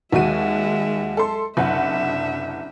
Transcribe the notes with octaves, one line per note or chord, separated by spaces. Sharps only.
D#2 G#3 F#4 E5 D#7
A4 C6
F#1 C2 D4 E5 F#5